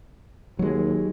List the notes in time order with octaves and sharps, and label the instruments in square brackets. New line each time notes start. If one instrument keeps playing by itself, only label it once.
[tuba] D#2 [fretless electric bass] F#3 G#3